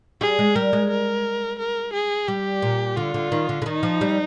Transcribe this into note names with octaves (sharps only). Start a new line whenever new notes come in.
G3 G#4
G#3
G3 A#4
G#3
A#4
A#4
G#4
G3 G4
A#2
D3 F4
D3
D#3
D3
D3
D#3 D#4
F3
G3